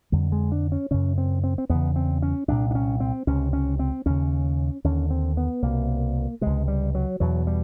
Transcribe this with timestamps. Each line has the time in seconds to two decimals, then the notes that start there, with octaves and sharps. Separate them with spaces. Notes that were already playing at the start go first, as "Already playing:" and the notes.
0.12 F2 D3 G3
0.32 G#3
0.52 D4
0.72 C#4
0.91 F#2 C#3 C#4
1.18 C4
1.44 C4
1.58 C4
1.69 E2 C#3 B3
1.96 C4
2.22 C#4
2.48 C2 A#2 D4
2.71 D4
2.75 C#4
3.00 C4
3.27 C#2 C3 C#4
3.53 C#4
3.79 C4
4.06 D#2 C#3 C#4
4.84 D#2 D3 C#4
5.10 C4
5.37 B3
5.62 C2 B2 A#3
6.41 C#2 C3 G#3
6.68 G3
6.95 F#3
7.20 E2 B2 F#3
7.47 G3